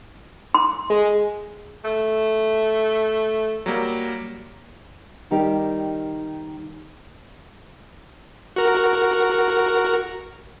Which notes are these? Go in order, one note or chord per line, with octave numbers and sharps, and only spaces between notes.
C6
G#3
A3
F#3 G3 A#3
D#3 G3 D#4 G4
F#4 A#4